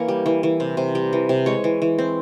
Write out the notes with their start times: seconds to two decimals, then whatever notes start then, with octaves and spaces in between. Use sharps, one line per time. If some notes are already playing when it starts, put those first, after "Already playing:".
Already playing: E3 A#3 C#5
0.08 G3
0.26 E3
0.43 E3
0.60 C3
0.77 C3
0.95 G3
1.13 E3
1.29 C3
1.46 G#3 C#5
1.64 E3
1.82 E3
1.98 C4